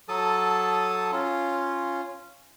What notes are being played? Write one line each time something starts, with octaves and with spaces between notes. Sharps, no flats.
F#3 A4 A5 D#6
C#4 F4